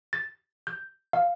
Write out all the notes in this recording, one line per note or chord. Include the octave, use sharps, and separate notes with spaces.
A6
G6
F5